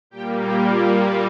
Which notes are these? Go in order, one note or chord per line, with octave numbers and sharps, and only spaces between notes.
A#2 G3 A#3 G4 G5
G4 G5
F4 F5